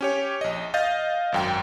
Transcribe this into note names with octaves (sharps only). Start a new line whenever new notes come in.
C#4 G4 C#5
A#1 D#5
D#5 F5 G6 A6
G#1 F#2 G5